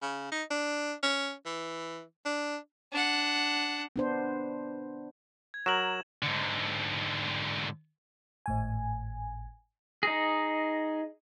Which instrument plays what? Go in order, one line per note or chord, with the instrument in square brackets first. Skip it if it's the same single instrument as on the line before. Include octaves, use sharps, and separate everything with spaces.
[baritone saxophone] C#3
D#4
D4
C#4
E3
D4
[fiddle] D4 F#5
[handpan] B3 D4 C5
[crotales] G#6
[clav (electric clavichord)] F#3 A#4 [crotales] E7 F#7
[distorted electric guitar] G#2 D3
[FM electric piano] G#1 A2 G#5
[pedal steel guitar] D#4 G#4 [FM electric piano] A#6